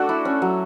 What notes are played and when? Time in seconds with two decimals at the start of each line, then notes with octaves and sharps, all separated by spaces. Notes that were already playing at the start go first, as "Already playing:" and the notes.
Already playing: A3 D4 F#4 A4 D5 E5
0.09 E4
0.25 C#4
0.42 F#3